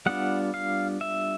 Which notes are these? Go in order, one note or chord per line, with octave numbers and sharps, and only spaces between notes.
G3 B3 D4 F4 F#5
F5
E5